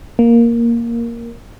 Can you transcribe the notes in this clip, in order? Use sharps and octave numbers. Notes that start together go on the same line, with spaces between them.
A#3